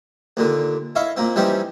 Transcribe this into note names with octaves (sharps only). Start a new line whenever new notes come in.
D#2 A#2 D3
E4 C#5 D#5 F5
A#2 A#3 C4
E3 G3 C4 C#4 D#4 G4